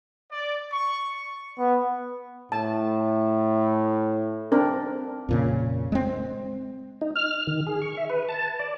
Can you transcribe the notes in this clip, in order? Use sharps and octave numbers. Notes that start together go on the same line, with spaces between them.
D5
C#6
B3
A2 A5
C4 D4 A#4
F2 A#2 C#3
G#3 C4
D#4
F6
D#3
G#4
C#6
E5
B4
A5
D5